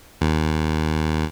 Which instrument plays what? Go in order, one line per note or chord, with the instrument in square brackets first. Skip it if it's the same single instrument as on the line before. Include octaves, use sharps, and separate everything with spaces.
[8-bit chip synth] D#2